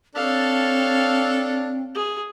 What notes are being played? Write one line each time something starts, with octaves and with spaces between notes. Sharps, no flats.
C4 D4 A4 C#5 F5
G#4